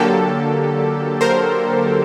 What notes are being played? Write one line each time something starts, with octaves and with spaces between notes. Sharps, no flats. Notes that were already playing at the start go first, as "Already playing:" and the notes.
Already playing: D3 F#3 A#3 G4 A4
A#4 C5